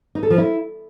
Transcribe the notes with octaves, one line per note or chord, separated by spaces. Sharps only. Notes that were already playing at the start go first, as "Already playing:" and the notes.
D#4
A4
F3
E4